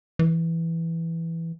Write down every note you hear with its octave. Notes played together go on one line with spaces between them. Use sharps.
E3